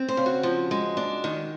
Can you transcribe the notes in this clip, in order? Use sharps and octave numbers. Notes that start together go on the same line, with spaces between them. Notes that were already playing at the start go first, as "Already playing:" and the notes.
Already playing: C4
C5
C#3
F#4
F3
G#3
D4
D#3